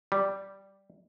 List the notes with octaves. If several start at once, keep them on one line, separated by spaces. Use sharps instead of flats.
G3